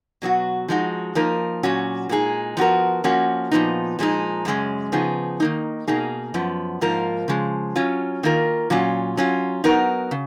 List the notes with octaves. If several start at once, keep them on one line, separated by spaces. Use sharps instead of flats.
B2 F#3 B3 F#4
F3 G#3 D#4 F#4
F3 A#3 D#4 A#4
A#2 F#3 C#4 F#4
A#2 G#3 D#4 G#4
F3 B3 F#4 A#4
F3 A#3 C#4 F#4
A#2 F3 B3 D#4
A#2 F3 G#3 D#4
F#2 C#3 F3 G#3 C#4
C#3 F3 B3 D#4 G#4
D#3 A#3 D#4
B2 A#3 D#4 G#4
F#2 F3 B3
G#2 F3 A#3 F4 A#4
C#3 F3 G#3
F#3 C#4 F4
D#3 A#3 F4 A#4
A#2 F#3 C#4 F4
F#3 C#4 F4
F#3 B3 D#4 A#4
C#3